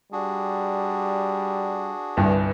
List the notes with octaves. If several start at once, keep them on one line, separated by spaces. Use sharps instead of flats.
G3 D4 F#4 G#4
G1 C2 G2